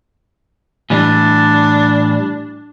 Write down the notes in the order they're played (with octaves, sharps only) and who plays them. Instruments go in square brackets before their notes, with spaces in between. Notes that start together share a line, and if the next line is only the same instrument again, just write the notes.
[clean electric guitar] A2 E3 G3 [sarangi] D4